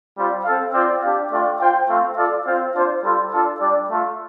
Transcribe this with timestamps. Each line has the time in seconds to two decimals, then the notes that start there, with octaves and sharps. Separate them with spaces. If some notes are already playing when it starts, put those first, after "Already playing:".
0.16 G3 C4 F4
0.45 C4 A4 F5
0.73 C4 F4 D5 G5
1.02 D4 G4 F5
1.30 A3 D4 F4 D5 G5
1.59 F4 C5 G5
1.87 A3 C4 F4 C5 F5
2.16 F4 A4 D5 F5
2.45 C4 F4 C5 F5
2.74 D4 F4 C5
3.02 G3 F4 A4 C5
3.31 D4 F4 A4
3.60 G3 D4 G4 D5
3.88 A3 F4 A4